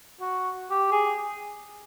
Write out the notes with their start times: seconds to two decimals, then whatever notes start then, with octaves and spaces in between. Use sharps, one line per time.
0.21 F#4
0.70 G4
0.92 G#4